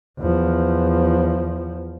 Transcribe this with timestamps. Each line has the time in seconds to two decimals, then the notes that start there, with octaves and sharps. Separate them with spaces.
0.19 E2 F3